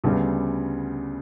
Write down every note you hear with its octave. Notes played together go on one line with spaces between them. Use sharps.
D2 C#3 G3 B3 D4